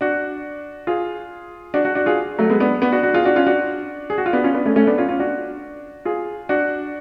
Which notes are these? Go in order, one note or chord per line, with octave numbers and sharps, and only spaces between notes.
D4 F#4
F4 G#4
D4 F#4
D4 F#4
D4 F#4
F4 G#4
F#3 A3
G#3 B3
B3 D4
B3 D4
D4 F#4
D4 F#4
F4 G#4
D4 F#4
C#4 F4
D4 F#4
G#4
F#4
F4
B3 D4
C#4 F4
B3 D4
A3 C#4
A3 C#4
B3 D4
C#4 F4
C#4 F4
D4 F#4
F4 G#4
D4 F#4